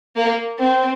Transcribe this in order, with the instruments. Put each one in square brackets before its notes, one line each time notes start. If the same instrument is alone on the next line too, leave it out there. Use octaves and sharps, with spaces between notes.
[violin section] A#3
C4